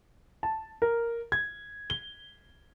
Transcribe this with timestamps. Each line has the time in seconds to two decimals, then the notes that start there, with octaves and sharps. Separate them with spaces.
0.43 A5
0.82 A#4
1.32 G#6
1.90 G7